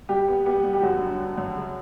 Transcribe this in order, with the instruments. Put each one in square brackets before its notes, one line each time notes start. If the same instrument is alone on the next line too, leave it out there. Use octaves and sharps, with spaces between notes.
[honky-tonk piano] G3 [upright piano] G4
[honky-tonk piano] B3
[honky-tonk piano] B3 [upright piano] G4
[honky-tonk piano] G3
[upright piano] G4
[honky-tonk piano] F#2 [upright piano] F#4
[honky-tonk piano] D3
D3
F#2
C#3